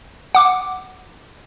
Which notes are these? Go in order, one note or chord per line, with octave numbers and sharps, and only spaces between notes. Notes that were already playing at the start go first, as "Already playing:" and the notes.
F#5 D6